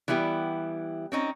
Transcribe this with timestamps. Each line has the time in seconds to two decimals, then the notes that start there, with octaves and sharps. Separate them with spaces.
0.08 E3 G3 B3 E4 G4
1.12 C4 C#4 D#4